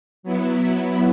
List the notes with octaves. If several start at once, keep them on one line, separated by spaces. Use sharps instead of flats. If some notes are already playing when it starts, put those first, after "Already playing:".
F#3 B3 E4